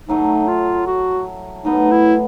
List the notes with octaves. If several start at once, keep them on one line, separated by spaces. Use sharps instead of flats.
A2 F#3 A3 D#4
F4
F#4
A2 F#3 B3 D#4
E4